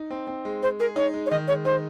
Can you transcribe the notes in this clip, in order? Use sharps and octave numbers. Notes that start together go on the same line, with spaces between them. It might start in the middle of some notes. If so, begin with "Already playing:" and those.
Already playing: D#4
C4
C4
G#3
G#3 C5
G#4 A#4
D#4 C#5
G#3
C#5
D#3 D#5
G#3 C#5
D#4 C5